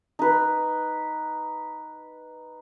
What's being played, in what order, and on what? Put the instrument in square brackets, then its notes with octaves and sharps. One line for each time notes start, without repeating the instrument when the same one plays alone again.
[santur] D#4 B4